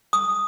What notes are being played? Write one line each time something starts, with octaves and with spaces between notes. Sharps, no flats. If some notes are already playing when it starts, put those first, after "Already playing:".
D#6